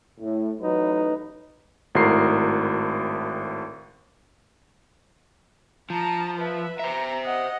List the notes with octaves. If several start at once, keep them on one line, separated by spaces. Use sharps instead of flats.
A2
A1 F#3 D#4 B4
G#1 A2 F#4 A#4 C6 C7
F3 A5 A#5
B4 E5
C5 E5 A#5
D#5 F#5